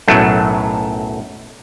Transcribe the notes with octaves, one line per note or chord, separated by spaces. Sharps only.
B1 F#2 A2 F#3 A3